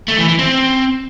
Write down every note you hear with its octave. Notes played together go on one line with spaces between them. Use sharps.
A3
E3
E3
C4